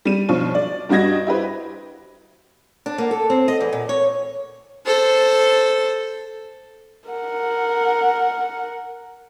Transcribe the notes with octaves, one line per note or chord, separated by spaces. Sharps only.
G3 D#7
B1 F3 D4 C#6
D5
G2 G3 F#4 D#5 G#6 A#6
E4 G4 B4 C5
D4
A#3
A4
C4
D#5
E2
A#2
C#5
A4 C5
A#4 F#5